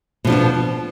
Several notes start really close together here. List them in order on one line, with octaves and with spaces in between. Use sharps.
B2 F3 D4 B3